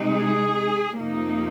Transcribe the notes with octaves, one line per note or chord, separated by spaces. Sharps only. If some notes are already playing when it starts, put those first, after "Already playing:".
Already playing: C3 G#3 D#4
G#4
F2 C3 F3 A#3 D#4